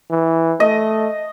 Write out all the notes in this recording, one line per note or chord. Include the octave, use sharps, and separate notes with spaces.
E3
A3 D#5